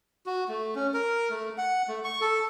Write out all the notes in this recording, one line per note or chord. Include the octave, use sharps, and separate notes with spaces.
F#4
A3
C#4
A#4
A3
F#5
A3
C#6
A4